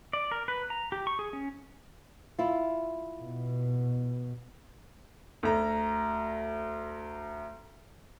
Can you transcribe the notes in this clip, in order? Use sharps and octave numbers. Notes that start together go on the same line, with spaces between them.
D5
A#4
B4
A#5
G4
C#6
G#4
C#4
E4 F4
B2
D2 A#5